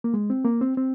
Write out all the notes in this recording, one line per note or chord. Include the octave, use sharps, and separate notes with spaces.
A#3
G#3
C4
A#3
C4
C4